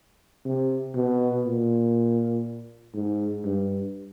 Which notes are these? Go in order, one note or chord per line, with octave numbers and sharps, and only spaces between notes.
C3
B2
A#2
G#2
G2